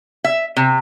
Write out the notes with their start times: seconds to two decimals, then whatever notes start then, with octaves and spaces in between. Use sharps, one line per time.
0.24 E5
0.57 C3